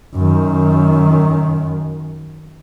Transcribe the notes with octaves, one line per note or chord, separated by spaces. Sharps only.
F#2 D#3